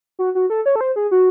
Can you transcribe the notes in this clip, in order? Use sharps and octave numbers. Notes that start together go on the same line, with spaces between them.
F#4
F#4
A4
C#5
A4
C5
G#4
F#4